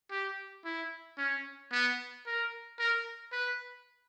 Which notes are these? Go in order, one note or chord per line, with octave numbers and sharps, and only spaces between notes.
G4
E4
C#4
B3
A#4
A#4
B4